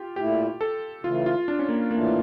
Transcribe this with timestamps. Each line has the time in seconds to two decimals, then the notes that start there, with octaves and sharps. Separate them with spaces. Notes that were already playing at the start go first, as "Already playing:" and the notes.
Already playing: F4 G4
0.16 A#2 A3 E4 G4
0.61 A4
1.03 C#3 E3 A3 F4
1.26 F4
1.48 D4
1.59 C#4
1.69 A#3
1.91 A2 E3 A3 A#3 D4 F4